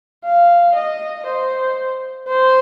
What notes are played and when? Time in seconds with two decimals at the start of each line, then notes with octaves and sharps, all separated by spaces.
0.24 F5
0.75 D#5
1.26 C5
2.28 C5